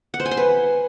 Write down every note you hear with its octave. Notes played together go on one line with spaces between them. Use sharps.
F#5
C5
G#5
C6
B4